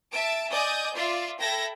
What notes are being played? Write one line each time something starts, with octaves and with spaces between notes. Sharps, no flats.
E5 A5 D7
D5 D#5 G#5 D#6 G6
F4 D5 E5 C6
A4 E5 G5 B5 G#6 A#6